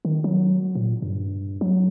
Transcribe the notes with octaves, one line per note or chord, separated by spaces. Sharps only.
D#3
F#3
A#2
G2
F#3